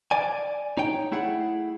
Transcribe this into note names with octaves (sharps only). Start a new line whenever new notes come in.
D5 G#5
D#4 C#5 G5
A3 E4 G#4 F#5